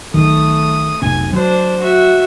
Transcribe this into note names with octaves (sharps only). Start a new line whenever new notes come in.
B1 D#3 A3 D#6
F1 B1 C3 G#5
F#3 D4 C5
F#4 E5